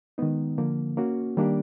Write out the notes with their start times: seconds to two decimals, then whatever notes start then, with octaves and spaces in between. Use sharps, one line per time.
0.18 D#3 G#3 B3 D#4
0.58 D3 F3 A#3
0.97 A#3 C#4 F#4
1.37 D#3 G3 A#3 D4 G4